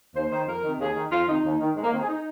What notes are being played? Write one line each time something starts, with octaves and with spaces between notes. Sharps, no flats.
D#2 C5
D#3 C5
F2 A#4
C3 D#3
D#2 G#4
D#3
F2 F4
C3 D#3 D#4
D#2
D#3
G#2 G#3
A#3
D#3 C4
G#4
D#4